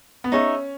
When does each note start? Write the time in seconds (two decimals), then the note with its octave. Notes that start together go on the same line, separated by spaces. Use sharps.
0.24 B3
0.32 C#4 D#4 G#4 C#5 E5